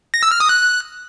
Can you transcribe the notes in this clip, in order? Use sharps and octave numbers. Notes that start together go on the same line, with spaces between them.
A#6
E6
F6
D#6
F#6